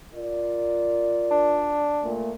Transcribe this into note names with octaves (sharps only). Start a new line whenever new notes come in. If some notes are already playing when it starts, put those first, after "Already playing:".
F4 A#4 D5
D4
A#2 A3